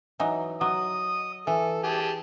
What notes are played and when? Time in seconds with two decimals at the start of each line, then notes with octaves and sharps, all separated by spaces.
0.20 E3 F#3 D#4
0.61 F#3 D#5 D#6
1.47 E3 A4
1.84 G4 G#4 A5